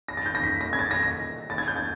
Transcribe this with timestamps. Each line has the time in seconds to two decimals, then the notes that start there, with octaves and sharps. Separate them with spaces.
0.08 A#6
0.17 A6
0.26 G6
0.35 A#6
0.43 B6
0.61 A#6
0.73 G#6
0.79 A6
0.91 A#6
1.03 A#6
1.50 A6
1.58 G#6
1.68 G6
1.76 A6